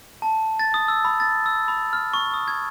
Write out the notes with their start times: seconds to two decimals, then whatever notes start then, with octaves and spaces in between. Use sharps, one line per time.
0.22 A5
0.59 A6
0.74 D#6
0.88 E6
1.05 B5
1.20 A6
1.46 E6
1.68 B5
1.93 F6
2.14 C#6
2.34 D#6
2.48 G#6